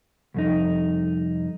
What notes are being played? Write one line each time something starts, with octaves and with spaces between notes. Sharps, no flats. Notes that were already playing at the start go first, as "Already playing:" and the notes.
C2 F2 D#4